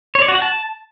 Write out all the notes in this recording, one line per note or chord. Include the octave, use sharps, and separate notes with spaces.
C#5
D5
F#4
F#5
A5